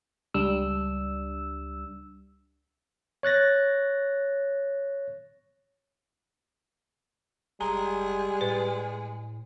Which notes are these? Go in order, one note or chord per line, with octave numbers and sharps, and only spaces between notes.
C#2 G3 D4 E6
C#5 F#6 A6 A#6
F1 G3 G#3 A#5
A2 B4